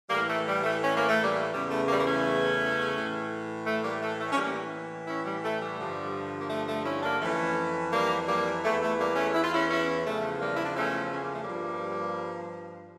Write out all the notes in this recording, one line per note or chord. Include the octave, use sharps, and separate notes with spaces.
A2 E3 G3 A#3
A3
G3
A3
C#4
A#3
A3
G3 A#3
E2 C#3 E3 G3
A3
G3 A#3
A#3
A3 C#4
A2 E3
A3
G3 A#3
A3
A3
C#4
A2 E3 G3 A#3
C#4 E4
G3
A3
G3
G2 D3 F3
A#3
A3
A3
C#4 E4
A#3 D4
F2 E3 A3 C#4
G3 A#3
G3 A#3
E2 E3 A3
A3
G3 A#3
A3 C#4
E4
F4
C#4 E4
C#4 E4
E2 C#3 F3 A3
G3 A#3
E4
D4
A3 C#4
C#4
A#3
A3
G2 F3 G3 A#3